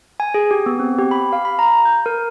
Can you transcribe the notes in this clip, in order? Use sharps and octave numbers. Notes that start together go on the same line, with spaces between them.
G#5
G#4
G4
B3
C4
G4
B5
F5
B5
A#5
G6
A#4